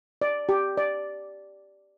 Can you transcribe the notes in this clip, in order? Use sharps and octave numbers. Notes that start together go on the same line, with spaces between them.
D5
G4
D5